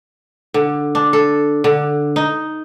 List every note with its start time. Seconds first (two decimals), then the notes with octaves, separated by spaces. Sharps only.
0.54 D3
0.95 D4
1.13 A4
1.64 D3
2.16 D#4